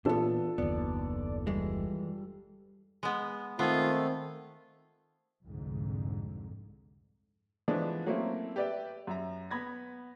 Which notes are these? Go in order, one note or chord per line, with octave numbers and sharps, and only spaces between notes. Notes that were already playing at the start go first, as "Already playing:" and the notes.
E2 A#2 B3 D4 F4 A4
F#1 D#2 B3 D5
E3 G3 G#3
G#3 B3
D#3 A3 B3 C4 F4 G#4
C2 F2 G#2 D3
E3 F3 G#3 A3 B3 D4
F#3 A3 A#3 C4 C#4 E4
G4 B4 D5 E5 G5
F#2 E5 A#5
B3 B5 G#6 A#6